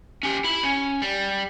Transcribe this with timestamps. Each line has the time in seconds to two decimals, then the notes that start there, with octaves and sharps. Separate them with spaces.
0.23 C#4 G4
0.44 E4 B5
0.63 C#4
1.02 G3